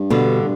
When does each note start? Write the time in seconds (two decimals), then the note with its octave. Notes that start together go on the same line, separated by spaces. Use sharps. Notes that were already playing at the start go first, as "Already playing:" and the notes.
Already playing: G2
0.10 B2 D3